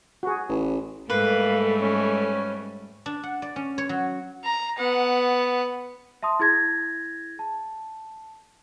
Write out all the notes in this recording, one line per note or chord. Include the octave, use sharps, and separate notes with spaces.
F#4 G#4
A1
G#2 G3 A3 A#3 A4 B4
C#4
D4
F#5
D5
C#4
C#5
F#3
A#5
B3 F#5
E5 A5 C6 D#6
E4 G#4 G#6 A#6
A5